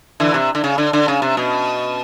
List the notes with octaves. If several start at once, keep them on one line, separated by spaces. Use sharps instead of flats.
D3 E3
C3
D3
C#3
D3
D3
C#3
C3
B2